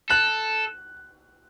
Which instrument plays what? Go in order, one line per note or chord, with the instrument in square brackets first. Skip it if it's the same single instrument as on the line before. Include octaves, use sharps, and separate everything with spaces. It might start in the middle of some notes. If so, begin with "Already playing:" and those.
[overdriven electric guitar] A4 [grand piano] F#6